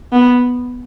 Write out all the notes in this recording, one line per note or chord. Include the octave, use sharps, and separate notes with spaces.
B3